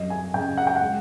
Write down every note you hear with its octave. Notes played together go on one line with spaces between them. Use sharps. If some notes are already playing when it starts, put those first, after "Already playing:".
Already playing: F#2 C3 D#5
G#5
C#3 G5
F#5
G5
F#5
G#3